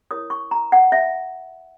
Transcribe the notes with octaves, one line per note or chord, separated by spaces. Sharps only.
E4 A#4 C#5 D#6
C#6
A#5
F#5
E5